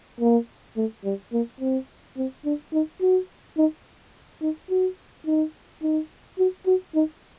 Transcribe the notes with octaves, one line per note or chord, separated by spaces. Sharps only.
A#3
A3
G3
A#3
C4
C4
D4
D#4
F#4
D#4
D#4
F#4
D#4
D#4
F#4
F#4
D#4